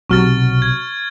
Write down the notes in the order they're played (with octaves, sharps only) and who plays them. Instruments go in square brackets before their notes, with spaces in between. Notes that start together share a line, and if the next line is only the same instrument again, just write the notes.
[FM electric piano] B1 C3 F#3 [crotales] C#6 F6 A6
[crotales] G#6